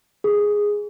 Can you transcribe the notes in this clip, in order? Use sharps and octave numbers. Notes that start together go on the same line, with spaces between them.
G#4